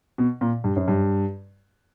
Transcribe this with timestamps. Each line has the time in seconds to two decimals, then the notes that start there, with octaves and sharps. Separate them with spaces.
0.18 B2
0.41 A#2
0.64 G2
0.76 F#2
0.88 G2